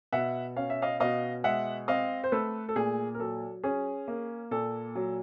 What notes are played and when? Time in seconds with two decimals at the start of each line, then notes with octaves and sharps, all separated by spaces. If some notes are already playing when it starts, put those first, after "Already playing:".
0.13 B2 E5 F#5
0.56 C#4 F5
0.70 E5
0.82 D#5 F5
1.00 B2 D#5 F5
1.44 G#3 E5 F#5
1.88 C4 D#5 F5
2.24 C5
2.32 A3 A4 B4
2.69 A4
2.76 A#2 G#4
3.14 A#4
3.20 F#3 A4
3.64 C#4 G#4
4.08 A#3
4.51 A#2 A4
4.95 F#3